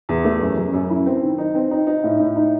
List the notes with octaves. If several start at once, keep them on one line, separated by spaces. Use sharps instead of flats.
E2
A3
F#2
F#2
F#2
E4
C4
D#3
D#4
C4
D#4
D#4
A2
A2
D#4